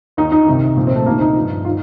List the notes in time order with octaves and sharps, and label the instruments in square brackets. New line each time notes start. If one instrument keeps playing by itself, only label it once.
[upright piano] D#2 D#3 D#4
D#4
C2 C3 D#3
C2 A#2 F3
C4
A3
D2 C3 D#3 A#3
D#4
G2 F3
D#3 F4